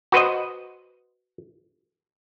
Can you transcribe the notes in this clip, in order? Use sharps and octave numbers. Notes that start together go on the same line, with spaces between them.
F#4 B4 C5 D#5